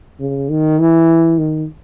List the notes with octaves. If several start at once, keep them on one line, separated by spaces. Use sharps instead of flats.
C#3
D#3
E3
D#3